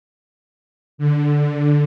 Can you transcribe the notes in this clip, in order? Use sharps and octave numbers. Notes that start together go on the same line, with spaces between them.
D3